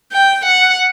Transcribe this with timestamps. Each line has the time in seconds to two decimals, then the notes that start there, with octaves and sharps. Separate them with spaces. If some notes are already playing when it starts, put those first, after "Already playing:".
0.12 G5
0.45 F#5